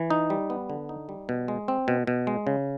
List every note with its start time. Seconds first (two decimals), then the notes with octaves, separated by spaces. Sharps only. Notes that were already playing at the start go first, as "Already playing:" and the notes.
Already playing: E3
0.10 D#4
0.30 G3
0.50 B3
0.70 D3
0.89 D#4
1.09 G3
1.29 B2
1.48 G#3
1.68 C4
1.88 B2
2.07 B2
2.27 G#3
2.47 C#3